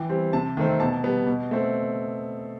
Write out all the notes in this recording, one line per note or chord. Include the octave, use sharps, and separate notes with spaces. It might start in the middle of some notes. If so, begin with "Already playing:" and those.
Already playing: E3 G5
G3 C4
C3 A5
D#3 A3 C4
B2 A5
G3 B3
B2
A3 C4